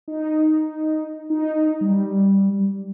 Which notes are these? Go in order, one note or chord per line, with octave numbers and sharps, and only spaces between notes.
D#4
D#4
G3